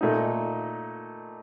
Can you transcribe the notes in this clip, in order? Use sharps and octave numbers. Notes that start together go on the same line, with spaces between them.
A#2 A3 D#4